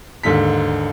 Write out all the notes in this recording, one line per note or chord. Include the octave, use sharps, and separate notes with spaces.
D#2 G#2 D3 A4 B6